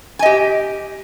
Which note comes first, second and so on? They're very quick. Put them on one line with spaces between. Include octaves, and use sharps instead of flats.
G#5 D#5 G4